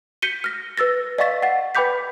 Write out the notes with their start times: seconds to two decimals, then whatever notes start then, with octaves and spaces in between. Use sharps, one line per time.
0.22 G6 B6 C#7 D#7 G7
0.44 F6 A#6
0.78 B4 E6 A6 A#6
1.18 D5 D#5 F5 C#6 A6 B6
1.42 F#5 A6
1.75 B4 G5 B5 D6 G6 B6